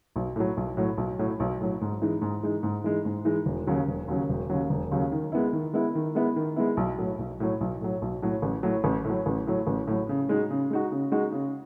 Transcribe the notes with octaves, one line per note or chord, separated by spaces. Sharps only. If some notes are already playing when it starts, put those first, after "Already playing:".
B1
A2 F#3
B1
A2 F#3
B1
A2 F#3
B1
A2 F#3
G#2
E3 G#3 D#4
G#2
E3 G#3 D#4
G#2
E3 G#3 D#4
G#2
E3 G#3 D#4
E1
D#2 C#3 F#3
E1
D#2 C#3 F#3
E1
D#2 C#3 F#3
E1
D#2 C#3 F#3
D#3
G#3 B3 E4
D#3
G#3 B3 E4
D#3
G#3 B3 E4
D#3
G#3 B3 E4
B1
A2 F#3
B1
A2 F#3
B1
A2 F#3
B1
A2 F#3
A1
A2 F#3
A1
A2
F#3
A1
A2 F#3
A1
A2 F#3
C#3
G#3 D#4 F#4
C#3
G#3 D#4 F#4
C#3
G#3 D#4 F#4
C#3